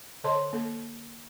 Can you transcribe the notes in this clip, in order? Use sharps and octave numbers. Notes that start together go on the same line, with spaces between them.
D3 A4 C#5 D#5 A5 C6
A#3 A4